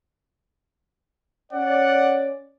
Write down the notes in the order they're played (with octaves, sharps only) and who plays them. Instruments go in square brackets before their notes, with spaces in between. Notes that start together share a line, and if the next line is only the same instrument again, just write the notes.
[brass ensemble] C#4 D5 [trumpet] F#5